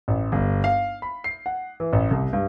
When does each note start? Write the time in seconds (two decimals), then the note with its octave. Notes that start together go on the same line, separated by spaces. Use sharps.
0.08 A1
0.32 G1
0.64 F5
1.02 B5
1.24 C7
1.46 F#5
1.80 E3
1.93 A1
2.11 C2
2.33 G2